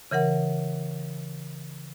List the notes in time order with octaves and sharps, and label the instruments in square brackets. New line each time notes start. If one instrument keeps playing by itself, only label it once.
[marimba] C#3 E3 A#4 F#5